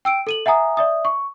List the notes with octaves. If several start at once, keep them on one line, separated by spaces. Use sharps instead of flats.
G5 E6 D7
A4 D#7 F#7
E5 F#5 G#5 A#5 D#6
D5 E5 D#6
C#6